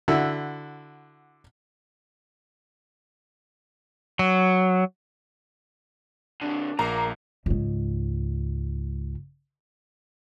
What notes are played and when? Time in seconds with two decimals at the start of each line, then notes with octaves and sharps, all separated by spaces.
0.08 D3 E4 F#4
4.19 F#3
6.41 A#2 D3 D4
6.79 A#1 A#3 A#5
7.46 C#2 G#2